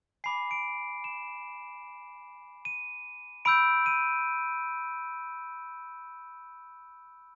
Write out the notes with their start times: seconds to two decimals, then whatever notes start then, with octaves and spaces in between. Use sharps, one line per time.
0.24 G#5 B5 D6 C7
0.51 D7
1.04 E7
2.65 D#7
3.45 B5 E6 G6 D7
3.86 D#7